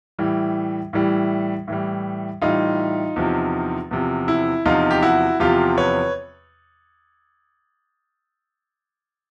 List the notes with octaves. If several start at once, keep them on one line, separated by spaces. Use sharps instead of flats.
A2 E3 G3
A2 E3 G3
A2 E3 G3
A2 E3 G3 D#4 F4
E2 C3 F3
E2 C3 F3
E4
E2 C3 F3 D#4 F4
G4
E4 F#4
E2 C3 F3 F4 G4
B4 C#5